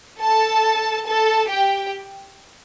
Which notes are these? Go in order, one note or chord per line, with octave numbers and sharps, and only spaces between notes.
A4 A5
A4 A5
G4 G5